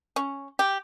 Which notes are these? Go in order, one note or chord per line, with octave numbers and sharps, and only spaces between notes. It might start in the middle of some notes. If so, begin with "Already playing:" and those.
C#4
G4